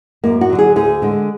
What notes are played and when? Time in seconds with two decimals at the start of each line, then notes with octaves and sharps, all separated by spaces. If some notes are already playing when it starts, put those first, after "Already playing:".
0.24 F#2 A#3
0.41 F#4
0.50 D3 F#3
0.59 G#4
0.76 D2 G#4
1.02 D3 G#3